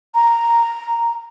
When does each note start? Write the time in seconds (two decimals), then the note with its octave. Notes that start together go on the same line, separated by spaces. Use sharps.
0.15 A#5